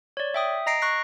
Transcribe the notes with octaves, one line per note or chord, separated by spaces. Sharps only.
C#5 D5
E5 G5 D#6
D#5 A#5 A#6 C7 D7
C#6 F#6 A#6 C7